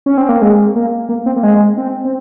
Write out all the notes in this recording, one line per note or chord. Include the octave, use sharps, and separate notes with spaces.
C#4
C4
A#3
G#3
A#3
A#3
C4
A#3
G#3
C4
C4